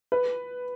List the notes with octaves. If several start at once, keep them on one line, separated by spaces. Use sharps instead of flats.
B4